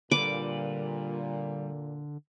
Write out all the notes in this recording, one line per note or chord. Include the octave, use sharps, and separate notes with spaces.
A#2 D3 G3 B4 D6